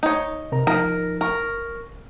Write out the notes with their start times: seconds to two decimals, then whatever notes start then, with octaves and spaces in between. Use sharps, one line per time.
0.03 D#4 C#5
0.52 C3 A#4 A#5
0.67 F3 D#4 A#4
1.21 A#4 C#6 F6